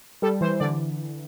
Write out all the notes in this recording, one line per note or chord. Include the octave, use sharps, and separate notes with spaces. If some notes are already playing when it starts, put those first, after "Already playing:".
G3 A4
E3 C5
D3 D5